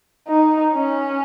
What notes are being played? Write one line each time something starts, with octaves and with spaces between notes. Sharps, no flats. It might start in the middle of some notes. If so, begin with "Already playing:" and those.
D#4
C#4